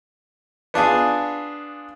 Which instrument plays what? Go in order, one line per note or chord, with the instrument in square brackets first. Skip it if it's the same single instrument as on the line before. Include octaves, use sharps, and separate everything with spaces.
[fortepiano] B3 D4 F4 G#4